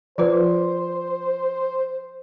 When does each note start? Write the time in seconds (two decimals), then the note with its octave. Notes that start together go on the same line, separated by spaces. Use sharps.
0.18 F3 F4 B4 C5